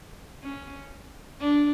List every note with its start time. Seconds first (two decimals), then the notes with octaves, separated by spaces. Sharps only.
0.43 C#4
1.40 D4